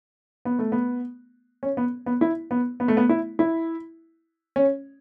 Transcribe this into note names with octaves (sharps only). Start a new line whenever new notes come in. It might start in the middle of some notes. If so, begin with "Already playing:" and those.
B3
A3
B3
C#4
B3
B3
E4
B3
B3
A3
B3
E4
E4
C#4